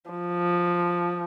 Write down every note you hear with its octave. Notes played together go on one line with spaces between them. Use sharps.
F3